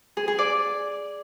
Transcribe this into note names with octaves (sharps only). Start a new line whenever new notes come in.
G#4
G#4
D5